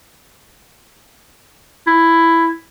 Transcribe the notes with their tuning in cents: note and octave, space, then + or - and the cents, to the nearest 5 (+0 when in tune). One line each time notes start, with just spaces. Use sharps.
E4 +5